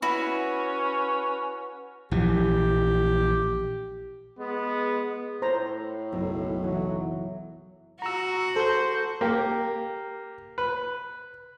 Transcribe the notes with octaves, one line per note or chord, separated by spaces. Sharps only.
C#4 E4 F#4 B4 B5
A#1 E3 G4
G#3 B3
A2 C5 A#5
F#1 B1
E3 F#3
F#4 A#5 E6
A4 C5 G6
A#3 G4
B4